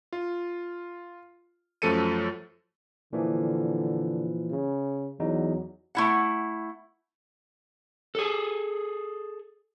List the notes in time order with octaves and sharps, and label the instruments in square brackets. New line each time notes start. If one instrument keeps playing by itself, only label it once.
[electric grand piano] F4
F#2 F3 A3 A4 C#7 D#7
[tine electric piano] A#2 E3 F3 [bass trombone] D3
[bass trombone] C#3
[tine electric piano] E2 D#4 [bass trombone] F#3
[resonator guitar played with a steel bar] A3 E4 F#5
[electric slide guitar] G#4 A4